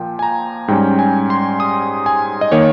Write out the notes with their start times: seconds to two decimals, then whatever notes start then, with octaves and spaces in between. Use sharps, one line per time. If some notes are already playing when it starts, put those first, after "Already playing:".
Already playing: A#2 F3 G5
0.19 G#5
0.23 A#5
0.68 G#2 G3 C#4 G5
0.99 G#5
1.30 C6
1.60 D#6
2.06 G#5
2.41 D#5
2.52 D#3 A#3 C#5